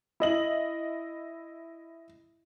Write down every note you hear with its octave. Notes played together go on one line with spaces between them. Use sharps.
E4 D#5 F#7